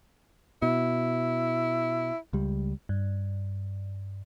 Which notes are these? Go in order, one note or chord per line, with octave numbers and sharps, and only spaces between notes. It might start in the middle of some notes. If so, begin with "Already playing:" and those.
B2 E4
C#2 G3
G2